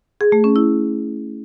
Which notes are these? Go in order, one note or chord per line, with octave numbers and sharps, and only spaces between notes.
G#4
A3
C#4
E4